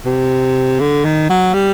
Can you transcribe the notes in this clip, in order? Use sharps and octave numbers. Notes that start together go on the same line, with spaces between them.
C3
D3
D#3
F#3
G3